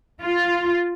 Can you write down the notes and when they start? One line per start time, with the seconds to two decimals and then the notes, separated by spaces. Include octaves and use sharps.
0.23 F4